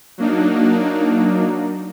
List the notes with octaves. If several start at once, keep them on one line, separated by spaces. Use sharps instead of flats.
F#3 A#3 D4 D#4